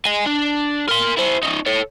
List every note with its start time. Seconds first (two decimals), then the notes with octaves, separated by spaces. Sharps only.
0.06 D#5 G#5
0.26 D4
0.89 A#4 C6
1.17 E4 C5
1.43 C#4 D#4
1.66 A4 C#5